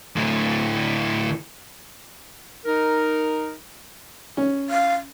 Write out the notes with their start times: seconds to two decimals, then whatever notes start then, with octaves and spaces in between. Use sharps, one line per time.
0.16 D2 A2
2.66 D#4 A#4
4.37 C#4
4.70 F5